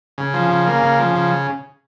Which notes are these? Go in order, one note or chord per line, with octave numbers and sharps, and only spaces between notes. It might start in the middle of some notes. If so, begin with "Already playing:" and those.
C#3
F3
C#3
A#3
C#3
F3
C#3